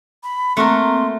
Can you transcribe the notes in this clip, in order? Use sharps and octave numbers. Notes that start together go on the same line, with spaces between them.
B5
A3 A#3 C4 F#4 A#4 C6